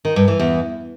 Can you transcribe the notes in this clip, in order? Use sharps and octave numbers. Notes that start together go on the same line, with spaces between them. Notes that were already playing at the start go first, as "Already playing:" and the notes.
D#3
G2
E3
E2